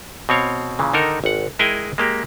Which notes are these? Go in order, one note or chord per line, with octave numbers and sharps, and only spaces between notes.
B2 C4 C#5 F5
A#2 C#3 E3
D3 D#3 D#4 A4 A#4
G#1 F#5
G#3 E4 G#4 A#4 G5 G#5
G#3 A#3 G4